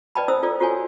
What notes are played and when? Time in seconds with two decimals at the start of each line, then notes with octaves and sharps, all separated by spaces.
0.15 B4 D5 D#5 G5 A5 B5
0.28 E4 C5 D#6 E6
0.43 F4 A4 D5
0.60 F4 F#4 A4 C#5 G#5